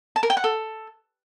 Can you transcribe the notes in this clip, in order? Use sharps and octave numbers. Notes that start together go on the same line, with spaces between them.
A5
A#4
G5
F#5
A4